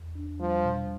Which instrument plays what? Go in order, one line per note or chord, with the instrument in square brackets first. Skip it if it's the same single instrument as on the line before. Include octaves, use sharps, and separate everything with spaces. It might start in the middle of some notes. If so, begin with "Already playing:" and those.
Already playing: [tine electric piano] E2
D4
[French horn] F3 [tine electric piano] G3
[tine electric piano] B2